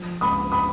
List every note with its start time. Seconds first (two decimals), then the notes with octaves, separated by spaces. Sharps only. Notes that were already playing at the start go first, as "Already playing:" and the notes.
Already playing: F3
0.21 C#2 B5 D#6
0.52 B5 D#6